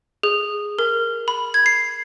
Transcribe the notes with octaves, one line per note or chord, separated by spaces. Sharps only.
G#4
A#4
B5
G#6
C7